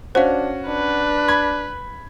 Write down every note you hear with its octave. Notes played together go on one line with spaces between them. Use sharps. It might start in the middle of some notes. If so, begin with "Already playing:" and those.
C#4 D4 F#4 C5 F5
D4 B4
B5 G#6